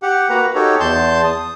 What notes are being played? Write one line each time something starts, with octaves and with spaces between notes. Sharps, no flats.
G4 F#5
A#3 F#4 B4 A#5
D#4 F#4 G4 A4 C#5
E2 A5 C6 G6
D#6